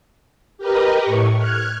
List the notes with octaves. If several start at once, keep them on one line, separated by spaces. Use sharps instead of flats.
G4 A#4 B4 D#5
A2 C#6
F6 F#6 G#6